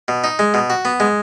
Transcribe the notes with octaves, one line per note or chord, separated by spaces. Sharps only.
B2
D#4
G#3
B2
F#4
B3
G#3